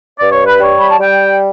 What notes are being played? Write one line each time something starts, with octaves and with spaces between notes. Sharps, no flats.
G2 D5
C#5
B4
G3 C#5
B5
A5
G3 G5